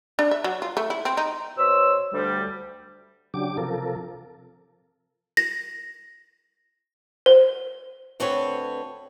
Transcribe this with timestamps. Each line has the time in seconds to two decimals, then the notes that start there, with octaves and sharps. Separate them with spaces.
0.19 D4
0.31 E5
0.44 F#3
0.62 F4
0.77 A3
0.90 E4
1.05 C4
1.17 D#4
1.58 B2 C5 C#5 E6
2.13 D2 G3
3.34 C#3 F#3 D4 G4 D6
3.57 C3 F3 A4 A#4
5.37 A#6
7.26 C5
8.20 D2 C4 A4 B4 C#5